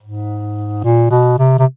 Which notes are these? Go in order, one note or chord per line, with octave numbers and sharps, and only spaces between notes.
G#2
A#2
B2
C3
C3